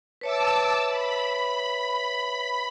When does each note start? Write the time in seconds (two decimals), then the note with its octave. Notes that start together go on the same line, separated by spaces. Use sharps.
0.21 B4 C#5 E5 A5 D6 E6
0.87 B5